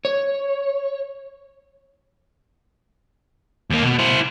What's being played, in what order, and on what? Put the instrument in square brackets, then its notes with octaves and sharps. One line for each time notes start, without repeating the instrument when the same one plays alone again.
[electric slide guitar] C#5
[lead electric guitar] D#2 A#3
B2
E4 C5